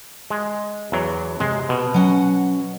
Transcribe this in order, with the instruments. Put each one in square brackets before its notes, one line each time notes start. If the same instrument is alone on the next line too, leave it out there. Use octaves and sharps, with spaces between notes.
[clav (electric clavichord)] G#3
E2 F#3
[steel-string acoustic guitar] C3 [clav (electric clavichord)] G#3
[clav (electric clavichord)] B2
[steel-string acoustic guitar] F#3 C#4 F#5